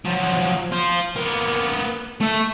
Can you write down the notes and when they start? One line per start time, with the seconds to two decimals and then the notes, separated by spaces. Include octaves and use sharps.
0.05 F3 F#3
0.72 F4 C5
1.16 A#3 B3
2.21 A3 E5